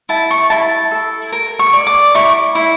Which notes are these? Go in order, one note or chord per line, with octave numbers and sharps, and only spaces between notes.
E4 A5
C#6
E4 A5
A4
A#4
C#6
D5
D6
E4 C#6
E4